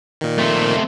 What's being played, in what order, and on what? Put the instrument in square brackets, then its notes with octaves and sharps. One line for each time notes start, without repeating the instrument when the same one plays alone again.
[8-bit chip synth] A#2 D#3
[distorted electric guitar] A3 C4